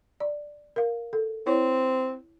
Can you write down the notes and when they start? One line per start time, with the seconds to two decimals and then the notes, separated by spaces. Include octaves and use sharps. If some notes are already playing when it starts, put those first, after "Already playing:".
0.20 D5
0.76 A#4 F5
1.13 A4
1.47 C4 E4 C#5